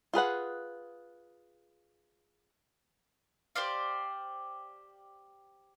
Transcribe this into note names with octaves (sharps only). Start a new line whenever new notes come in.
F4 G#4 B4 F#5
G4 C5 D5 F5